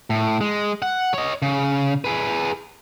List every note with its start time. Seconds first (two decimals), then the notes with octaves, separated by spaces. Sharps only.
0.10 A2
0.41 G#3
0.82 F#5
1.14 C#5 D#5
1.42 C#3
2.05 G#4 B4